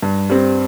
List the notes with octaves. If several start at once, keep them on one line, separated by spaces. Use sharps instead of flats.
G2
G3 C4